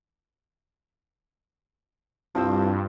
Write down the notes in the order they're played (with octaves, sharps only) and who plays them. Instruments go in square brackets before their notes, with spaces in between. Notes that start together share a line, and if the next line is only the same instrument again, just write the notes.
[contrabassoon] C2 [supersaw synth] G2 [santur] F3 C4 E6